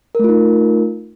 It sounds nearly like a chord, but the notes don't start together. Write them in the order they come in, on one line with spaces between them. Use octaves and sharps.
A#4 A3 F4 D#4